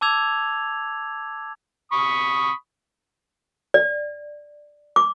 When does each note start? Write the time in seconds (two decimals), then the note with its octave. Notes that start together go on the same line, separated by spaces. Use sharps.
0.01 A5 D6 E6 G#6 F7
1.92 B5 C#6 D#6
3.74 D5
4.96 D6